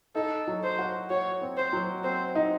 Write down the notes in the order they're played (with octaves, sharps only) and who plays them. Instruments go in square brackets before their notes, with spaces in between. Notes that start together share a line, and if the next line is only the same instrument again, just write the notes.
[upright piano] D#4 [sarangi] A4
[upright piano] F#3
[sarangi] C5
[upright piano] F#4
[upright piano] F#4 [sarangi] C#5
[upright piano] C4
[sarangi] C5
[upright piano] F#3
[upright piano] C4 [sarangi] C5
[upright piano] D#4